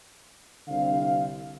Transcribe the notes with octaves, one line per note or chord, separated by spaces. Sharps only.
C2 D3 C4 F5